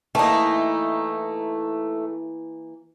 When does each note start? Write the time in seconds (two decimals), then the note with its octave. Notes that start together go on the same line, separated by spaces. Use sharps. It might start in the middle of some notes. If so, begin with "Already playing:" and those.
0.15 E3 A3 A#3 D#4 G5 A5